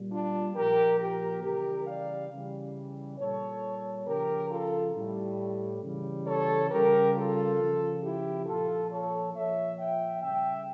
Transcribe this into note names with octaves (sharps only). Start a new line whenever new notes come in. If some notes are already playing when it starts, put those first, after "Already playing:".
Already playing: A#2 G3
D4 F4
A#2 F3 G4 A#4
G4 A#4
C#3 E3 G3 G4 A#4
D5 F5
C#3 E3 G3
A#2 G3 A4 C#5
C#3 F3 G4 A#4
F4 A4
A2 G3
C#3 E3 G3
A4 C#5
C#3 G3 G4 A#4
F4 A4
C#3 F3
E4 G4
A#2 F3 F4 A4
A4 C#5
A#2 F3 C#5 E5
E5 G5
C#3 G3 E5 G5